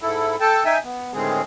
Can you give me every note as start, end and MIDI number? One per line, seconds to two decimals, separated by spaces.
0.02 0.36 44
0.02 0.36 64
0.02 0.36 69
0.40 0.64 69
0.40 0.64 79
0.40 0.64 81
0.65 0.78 63
0.65 0.78 76
0.65 0.78 79
0.65 0.78 80
0.84 1.13 59
1.14 1.42 45
1.14 1.42 50
1.14 1.42 51
1.14 1.42 56
1.14 1.42 60
1.14 1.42 68